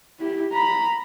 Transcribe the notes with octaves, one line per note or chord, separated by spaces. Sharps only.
E4 G4
A#5 B5